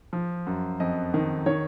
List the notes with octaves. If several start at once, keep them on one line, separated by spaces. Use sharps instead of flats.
F3
F#2
F2 D#5
D#3
D#3 C#5